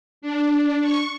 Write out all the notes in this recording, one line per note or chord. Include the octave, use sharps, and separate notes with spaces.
D4
C#6